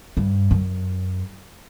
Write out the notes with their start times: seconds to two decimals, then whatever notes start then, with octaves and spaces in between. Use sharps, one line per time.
0.17 G2
0.51 F#2